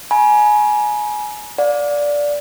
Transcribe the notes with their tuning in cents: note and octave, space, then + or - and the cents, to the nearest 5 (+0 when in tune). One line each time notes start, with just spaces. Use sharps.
G#5 +20 B5 -45
D5 -10 F5 +40